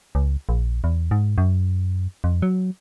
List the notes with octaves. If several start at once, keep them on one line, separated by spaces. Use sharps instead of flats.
C#2
A#1
E2
G#2
F#2
F2
F#3